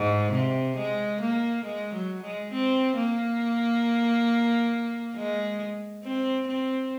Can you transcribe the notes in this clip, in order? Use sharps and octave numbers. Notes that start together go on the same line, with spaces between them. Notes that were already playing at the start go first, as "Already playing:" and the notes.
Already playing: G#2
C3
G#3
A#3
G#3
F#3
G#3
C4
A#3
G#3
C4
C4